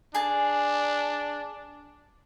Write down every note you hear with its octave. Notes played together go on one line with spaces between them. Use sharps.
D4 G#4 A5